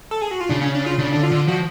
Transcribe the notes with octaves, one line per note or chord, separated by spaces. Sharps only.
A4
G#4
F#4
F4
C#3 D4
C#4
D4
F4
C#3 D4
D3 D4
F4
D3
F3 F#4